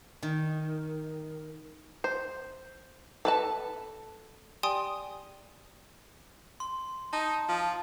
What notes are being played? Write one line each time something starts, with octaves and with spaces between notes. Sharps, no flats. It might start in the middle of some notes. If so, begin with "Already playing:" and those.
D#3
C5
A4 B4 A5
G4 D5 G5 G#5 C6 D#6
C6
D#4 A5
F3